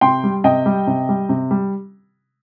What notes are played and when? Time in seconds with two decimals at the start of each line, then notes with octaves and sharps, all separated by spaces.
0.01 C3 G5 C6
0.23 G3
0.44 C3 D#5 G5
0.66 G3
0.87 C3
1.09 G3
1.29 C3
1.51 G3